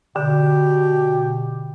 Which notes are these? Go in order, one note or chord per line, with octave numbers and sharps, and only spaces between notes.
B2 D3 G4